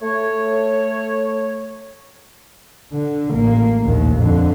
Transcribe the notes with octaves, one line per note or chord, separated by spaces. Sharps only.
A3 C#5
D3
A1 A#3
A#1 D#2
F2 D3